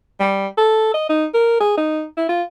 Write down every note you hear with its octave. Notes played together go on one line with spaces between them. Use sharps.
G3
A4
D#5
D#4
A#4
G#4
D#4
E4
F4